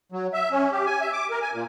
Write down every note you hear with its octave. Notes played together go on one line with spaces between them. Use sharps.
F#3
E5
C#4
G4
G#5
E5
D6
A#4
G#5
A#2